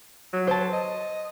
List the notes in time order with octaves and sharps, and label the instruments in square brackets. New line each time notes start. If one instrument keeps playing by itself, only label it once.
[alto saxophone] F#3
[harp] C5 A5
[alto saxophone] D#5